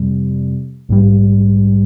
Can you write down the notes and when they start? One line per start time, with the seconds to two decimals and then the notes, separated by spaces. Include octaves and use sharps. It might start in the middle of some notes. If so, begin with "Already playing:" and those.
Already playing: F2 C3 G3
0.89 A#1 G#2 G3